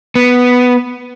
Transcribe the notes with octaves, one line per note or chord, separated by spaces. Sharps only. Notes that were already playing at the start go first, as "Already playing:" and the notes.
B3